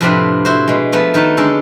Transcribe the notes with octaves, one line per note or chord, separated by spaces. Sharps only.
F2 A2 C3 C4 D4 B4
E4 F#4 C5
B2 G#3
F3 A3 B3 F#4
D#3 D#4 B4 C#5 A5
D3 G#3 C#4 A4